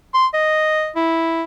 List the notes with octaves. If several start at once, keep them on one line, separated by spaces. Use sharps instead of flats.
C6
D#5
E4